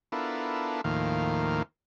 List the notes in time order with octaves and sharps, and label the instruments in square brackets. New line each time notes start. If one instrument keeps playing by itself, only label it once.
[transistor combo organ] B3 D4 E4 F4 A4 A#4
D#2 A2 D#3 F3 A#3 F5